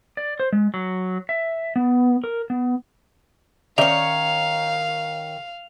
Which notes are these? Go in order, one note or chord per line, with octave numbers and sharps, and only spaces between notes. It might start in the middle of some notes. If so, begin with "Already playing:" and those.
D5
C5
G#3
F#3
E5
B3
A#4
B3
D#3 C#4 C#5 D5 E5 F5 F7